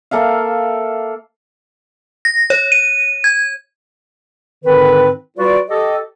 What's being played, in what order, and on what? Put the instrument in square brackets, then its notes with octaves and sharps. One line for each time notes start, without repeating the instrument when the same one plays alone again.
[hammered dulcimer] A#3 A4 E5 F5
[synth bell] A#6
C#5
D#7
G#6
[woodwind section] G#2 D3 D#3 C4 B4
G3 F4 F#4 B4 D5
G4 A4 D#5